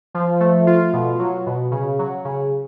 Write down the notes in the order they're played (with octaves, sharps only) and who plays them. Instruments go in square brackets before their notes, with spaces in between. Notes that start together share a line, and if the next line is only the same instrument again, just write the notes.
[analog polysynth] F3
A3
F4
B2
F#3
B2
C#3
F#3
C#3